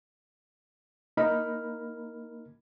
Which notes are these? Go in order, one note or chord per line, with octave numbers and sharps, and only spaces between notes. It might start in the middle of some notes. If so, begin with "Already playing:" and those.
A#3 D#4 A#4 B5 F6